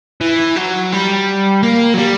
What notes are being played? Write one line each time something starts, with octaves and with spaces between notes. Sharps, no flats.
E3
F#3
G3
A#3
F#3
G3